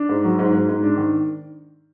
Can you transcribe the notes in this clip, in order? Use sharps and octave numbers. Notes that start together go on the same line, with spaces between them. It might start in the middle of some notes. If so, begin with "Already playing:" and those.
Already playing: D4
G#2
F#3
G#2
G#2
G#2
D4
D#3